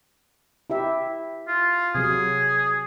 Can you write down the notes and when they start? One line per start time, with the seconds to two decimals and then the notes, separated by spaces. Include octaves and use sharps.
0.70 E4 G4 E5
1.48 F4
1.95 C3 F#3 G#4